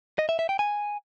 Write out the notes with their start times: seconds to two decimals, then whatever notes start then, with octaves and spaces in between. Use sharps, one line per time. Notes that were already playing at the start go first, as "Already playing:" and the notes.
0.19 D#5
0.29 E5
0.39 E5
0.49 G5
0.59 G#5